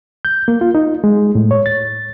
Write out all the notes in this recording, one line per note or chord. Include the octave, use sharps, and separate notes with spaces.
G6
A#3
F4
D#4
G#3
A2
C#5
A6